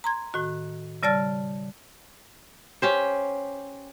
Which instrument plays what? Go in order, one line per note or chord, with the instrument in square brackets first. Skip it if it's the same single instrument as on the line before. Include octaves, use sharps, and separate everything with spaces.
[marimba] A#5 C6 G#6
A2 D#3 F#4
C#3 G3 D5 A5 F6 A6
[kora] C#4 G4 C5